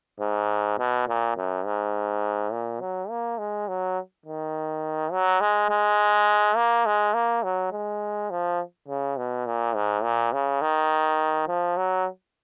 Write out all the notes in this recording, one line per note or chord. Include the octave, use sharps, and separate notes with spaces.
G#2
B2
A#2
F#2
G#2
A#2
F#3
A#3
G#3
F#3
D#3
F#3
G#3
G#3
A#3
G#3
A#3
F#3
G#3
F3
C#3
B2
A#2
G#2
A#2
C#3
D#3
F3
F#3